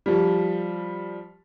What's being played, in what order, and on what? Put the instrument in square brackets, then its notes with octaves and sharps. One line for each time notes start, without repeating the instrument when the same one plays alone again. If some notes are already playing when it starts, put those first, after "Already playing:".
[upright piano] F3 G3